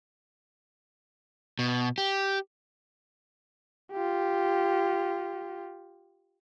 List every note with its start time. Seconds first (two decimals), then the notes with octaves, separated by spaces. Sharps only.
1.59 B2
1.98 G4
3.92 F4 G4